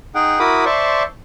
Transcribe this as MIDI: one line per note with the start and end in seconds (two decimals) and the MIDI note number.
0.15 0.39 63
0.15 0.39 68
0.15 0.39 78
0.15 0.39 79
0.39 0.65 64
0.39 0.65 66
0.39 0.65 70
0.39 0.65 83
0.39 0.65 86
0.39 0.65 87
0.65 1.03 72
0.65 1.03 74
0.65 1.03 76
0.65 1.03 81
0.65 1.03 84
0.65 1.03 85